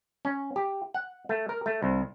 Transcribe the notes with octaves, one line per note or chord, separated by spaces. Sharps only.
C#4
G4
F#5
A3
A#4
A3
C2